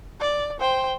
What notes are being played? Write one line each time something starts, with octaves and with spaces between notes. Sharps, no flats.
D5
C5 G5